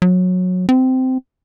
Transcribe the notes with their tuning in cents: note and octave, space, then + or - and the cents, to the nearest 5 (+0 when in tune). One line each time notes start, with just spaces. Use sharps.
F#3 -20
C4 -15